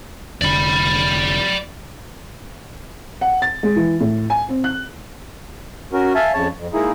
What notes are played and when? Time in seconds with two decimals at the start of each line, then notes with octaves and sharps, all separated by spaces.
0.42 F1 D3 D5 B5
3.21 F#5
3.42 A6
3.63 G#3
3.76 E3
4.00 A2
4.30 G#5
4.49 C4
4.64 F#6
5.93 C#4 F#4 A#4
6.15 E5 F5 G#5 A5
6.33 F2 C#3 C#5 A5
6.57 F2
6.73 G#3 A#3 D#4 E4 G#4